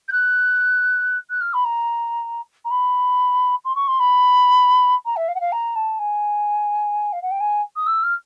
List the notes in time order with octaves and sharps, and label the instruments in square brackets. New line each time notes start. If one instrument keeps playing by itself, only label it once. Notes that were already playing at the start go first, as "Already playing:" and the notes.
[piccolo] G6
F#6
F#6
F6
B5
A#5
A#5
B5
C6
C#6
C6
B5
A#5
E5
F5
F#5
F5
A#5
A5
G#5
F5
F#5
G5
G#5
D#6
E6
F6